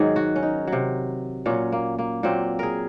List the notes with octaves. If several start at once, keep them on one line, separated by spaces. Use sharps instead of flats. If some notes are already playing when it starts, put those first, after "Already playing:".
Already playing: G#2 D#3 F#3 G#4
F#4
C#4
D#4
C3 F#3
A#2 F#3 C#4
A#3
A#3
A#2 F#3 C4
G#4 A#4